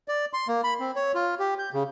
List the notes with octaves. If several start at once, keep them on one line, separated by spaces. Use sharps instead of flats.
D5
C6
A#3
B5
C4
C#5
F4
G4
G6
C#3